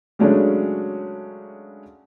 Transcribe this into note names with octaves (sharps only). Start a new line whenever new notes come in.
C#3 F#3 G#3 A3 C#4 D4